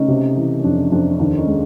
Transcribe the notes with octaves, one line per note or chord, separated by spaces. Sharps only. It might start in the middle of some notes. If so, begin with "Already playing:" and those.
Already playing: C#3 A3 C#4 D#4
C3
E3
C#4
F2 D4
F2 D4
C#4
D#2 D4
C#4 D#4
G#3